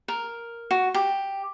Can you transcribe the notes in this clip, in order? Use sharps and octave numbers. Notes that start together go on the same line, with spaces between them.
A#4
F#4
G4